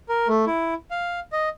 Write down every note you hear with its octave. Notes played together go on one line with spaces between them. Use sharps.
A#4
A3
E4
F5
D#5